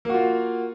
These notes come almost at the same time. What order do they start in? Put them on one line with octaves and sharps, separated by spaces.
A#3 F#4 F4